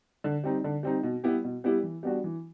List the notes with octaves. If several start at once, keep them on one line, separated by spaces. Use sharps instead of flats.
D3
G3 C4 D#4
D3
G3 C4 D#4
B2
G3 B3 E4 G4
B2
G3 B3 E4 G4
E3
G3 B3 D4 F#4
E3